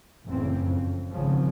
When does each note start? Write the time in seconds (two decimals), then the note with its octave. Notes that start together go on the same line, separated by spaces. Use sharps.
0.25 F#1 E2 A2 C#3 E3 C4
0.62 F2
1.10 G#1 C#3 F3